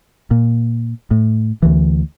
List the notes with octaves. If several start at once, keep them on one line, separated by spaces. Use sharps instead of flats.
A#2
A2
D2 E3